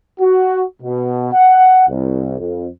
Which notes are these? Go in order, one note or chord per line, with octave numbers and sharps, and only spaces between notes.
F#4
B2
F#5
C2
F2